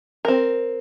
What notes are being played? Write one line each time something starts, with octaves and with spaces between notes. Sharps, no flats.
C4 A#4